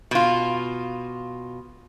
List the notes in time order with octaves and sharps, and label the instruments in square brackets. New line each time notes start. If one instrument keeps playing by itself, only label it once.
[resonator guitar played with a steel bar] B2 F4